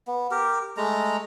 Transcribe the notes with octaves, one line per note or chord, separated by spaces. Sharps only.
B3
G4 A#4
G#3 A3 A#5